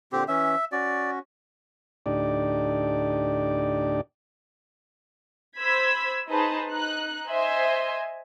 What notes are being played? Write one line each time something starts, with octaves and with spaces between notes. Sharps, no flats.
A#2 D3 C4 G4
E3 C#4 E5
C#4 F#4 D5
D2 A2 D4 D#4 G4 D5
C5 B5 E6 G#6 B6
D#4 G#4 B4 C5 A5
D#4 F#6
C5 D#5 E5 G#5 C6